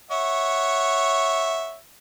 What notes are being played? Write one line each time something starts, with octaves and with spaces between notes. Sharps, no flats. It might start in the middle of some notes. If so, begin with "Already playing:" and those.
C#5 E5 F#5